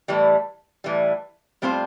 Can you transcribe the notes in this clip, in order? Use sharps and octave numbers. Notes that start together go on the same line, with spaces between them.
A2 E3 G3
A2 E3 G3
A2 G3 C4 F4 C5